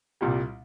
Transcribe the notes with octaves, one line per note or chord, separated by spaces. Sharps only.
C2 A#2 G3